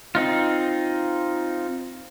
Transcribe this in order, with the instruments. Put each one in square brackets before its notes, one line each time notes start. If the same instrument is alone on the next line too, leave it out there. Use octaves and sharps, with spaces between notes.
[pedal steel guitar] C4 D#4 F4